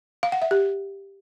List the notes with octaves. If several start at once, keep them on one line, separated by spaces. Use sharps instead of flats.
F5
F#5
E5
G4